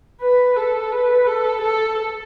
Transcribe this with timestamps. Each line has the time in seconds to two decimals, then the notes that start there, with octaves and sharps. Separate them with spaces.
0.21 B4
0.57 A4
0.93 B4
1.27 A4
1.62 A4